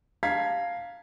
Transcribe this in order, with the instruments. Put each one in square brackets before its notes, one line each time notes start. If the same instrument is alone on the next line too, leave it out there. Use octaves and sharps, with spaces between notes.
[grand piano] F5 A5 A#5 G#6 B6